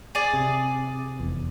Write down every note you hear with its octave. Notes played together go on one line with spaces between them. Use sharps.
G#4 D5
C3
F1 E2